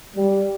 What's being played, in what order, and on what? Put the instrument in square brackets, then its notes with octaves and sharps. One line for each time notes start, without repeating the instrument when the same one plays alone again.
[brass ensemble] G3